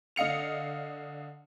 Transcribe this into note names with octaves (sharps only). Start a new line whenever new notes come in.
D3 D#5 F5 C#7 F7